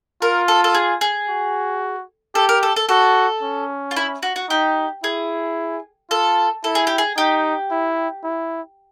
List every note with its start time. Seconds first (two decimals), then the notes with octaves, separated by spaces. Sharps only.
0.22 F4 A#4
0.48 A4
0.64 A4
0.74 G#4
1.01 G#4
1.29 F#4
2.35 G4 A4
2.49 A#4
2.63 A4
2.76 A4
2.89 F#4 A4
3.42 C#4
3.91 F4
3.96 E4
4.23 F#4
4.36 F#4
4.50 D#4 G4
5.04 E4 G#4
6.10 F4 A4
6.64 E4 A4
6.75 G#4
6.87 G4
6.98 G#4
7.17 D#4 G4
7.71 E4
8.24 E4